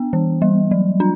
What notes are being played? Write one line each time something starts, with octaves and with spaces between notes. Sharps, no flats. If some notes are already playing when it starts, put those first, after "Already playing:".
Already playing: B3 D4
E3
G3
F#3
D4